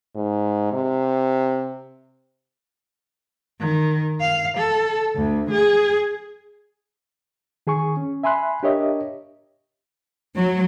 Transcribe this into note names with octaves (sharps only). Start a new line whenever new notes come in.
G#2
C3
D#3
F5
A4
D2
G#4
D#3 G#4 G#5 C#6
C#4
E5 G#5 B5 C6 F#6
D4 G4 A#4 C#5 D#5 E5
F#3